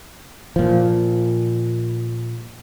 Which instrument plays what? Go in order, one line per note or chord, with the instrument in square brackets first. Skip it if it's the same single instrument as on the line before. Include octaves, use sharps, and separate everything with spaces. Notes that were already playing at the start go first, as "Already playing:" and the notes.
[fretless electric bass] A#2 F3